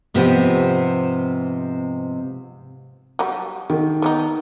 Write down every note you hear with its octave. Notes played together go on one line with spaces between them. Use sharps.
G#2 C3 F3 B3 C4
F#3 G3
D3 D#3
B3 D4 D#4